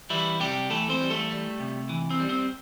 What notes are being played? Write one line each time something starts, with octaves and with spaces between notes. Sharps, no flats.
E3 G3 E4
C3 G3 G4
E3 A3 A4
C4 C5
G3
A3 A4
G3
C3
E3
C4
G3
C4